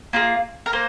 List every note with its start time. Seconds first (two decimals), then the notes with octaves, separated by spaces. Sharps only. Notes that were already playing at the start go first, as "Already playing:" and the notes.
0.13 A#3 F4 G#4
0.66 A#4
0.73 A#3 C5